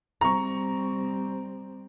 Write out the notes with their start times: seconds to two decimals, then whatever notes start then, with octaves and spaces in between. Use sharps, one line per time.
0.21 G3 C4 A#5 C#6